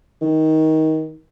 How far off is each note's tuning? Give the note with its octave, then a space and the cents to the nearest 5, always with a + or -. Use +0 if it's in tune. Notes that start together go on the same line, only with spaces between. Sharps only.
D#3 +20